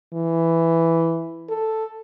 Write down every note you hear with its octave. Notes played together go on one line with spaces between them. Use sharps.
E3
A4